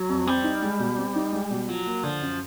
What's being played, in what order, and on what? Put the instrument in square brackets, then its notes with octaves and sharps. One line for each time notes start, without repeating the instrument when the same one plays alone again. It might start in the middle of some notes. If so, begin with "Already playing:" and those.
Already playing: [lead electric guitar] F#3
[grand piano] F2
[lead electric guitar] G3 [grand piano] C4
[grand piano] D#4
G#3
B2
C4
D#4
G#3
B2
[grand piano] F3 [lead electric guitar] F#3
[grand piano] A#3
[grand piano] D3 [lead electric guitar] F3
[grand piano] F#2